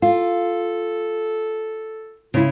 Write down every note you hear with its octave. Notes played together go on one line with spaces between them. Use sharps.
F4 A4
C#3 E4 F4